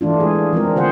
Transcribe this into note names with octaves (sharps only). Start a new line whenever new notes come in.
E3 A3 D4 F4
G#3 G#4
F3 G#3 C4 A#4
D3 G#4 C5 F#5